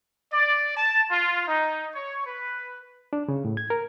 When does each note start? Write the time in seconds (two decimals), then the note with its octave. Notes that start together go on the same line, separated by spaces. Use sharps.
0.32 D5
0.77 A5
1.10 F4
1.47 D#4
1.95 C#5
2.25 B4
3.13 D4
3.28 C#3
3.45 A2
3.57 G#6
3.70 A#4